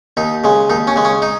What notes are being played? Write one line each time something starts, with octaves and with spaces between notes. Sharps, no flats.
D#2 D#4
C#3 G#3
D#2 D#4
C#4
C#3 G#3
C#4
D#4